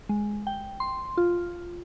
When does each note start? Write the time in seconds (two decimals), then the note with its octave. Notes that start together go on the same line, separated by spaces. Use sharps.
0.09 G#3
0.47 G5
0.80 C6
1.17 F4